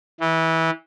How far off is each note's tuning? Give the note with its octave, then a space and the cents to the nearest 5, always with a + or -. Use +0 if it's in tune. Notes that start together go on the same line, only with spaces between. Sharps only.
E3 -20